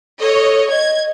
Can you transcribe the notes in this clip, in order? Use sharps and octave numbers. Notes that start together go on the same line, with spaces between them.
A4 C#5 D#5
D#5 G#6